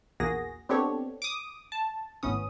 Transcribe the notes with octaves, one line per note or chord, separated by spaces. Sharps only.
A#1 E2 A#3 F#4 G#4 A#6
B3 C4 D4 G4 A4 C#5
D6 D#6
A5
G#1 A2 B3 C#4 D#6